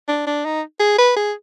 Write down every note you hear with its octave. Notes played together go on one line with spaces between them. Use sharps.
D4
D4
D#4
G#4
B4
G#4